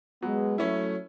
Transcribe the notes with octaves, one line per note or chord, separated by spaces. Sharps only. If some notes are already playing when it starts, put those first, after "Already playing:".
F#3 G#3 B3
F#3 A3 C#4 E4